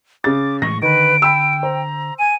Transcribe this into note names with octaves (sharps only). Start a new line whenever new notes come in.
C#3 D6 A6
A2 E3 G#3 C#6 A#6
D3 D#3 B4 D7
G5 B5 E6
C5 A#5
G#5 D#7